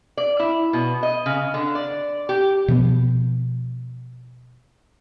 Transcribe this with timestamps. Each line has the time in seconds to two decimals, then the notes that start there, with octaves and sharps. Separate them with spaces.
0.17 D5
0.39 E4
0.73 B2
1.03 D#5
1.26 C#3
1.54 D3
1.75 D5
2.29 G4
2.68 B2 F3 B3